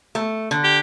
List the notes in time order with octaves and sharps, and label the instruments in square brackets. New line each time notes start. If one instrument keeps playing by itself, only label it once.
[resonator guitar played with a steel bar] A3
D3
[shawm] G4